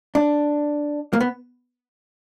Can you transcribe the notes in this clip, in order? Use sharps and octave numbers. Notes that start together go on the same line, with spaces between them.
D4
A#3
B3